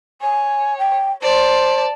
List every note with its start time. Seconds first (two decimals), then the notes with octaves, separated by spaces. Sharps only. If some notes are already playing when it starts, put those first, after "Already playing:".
0.22 C#5 G#5
0.79 G5
1.22 C5 D5 A5